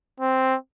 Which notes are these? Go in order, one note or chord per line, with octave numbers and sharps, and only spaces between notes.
C4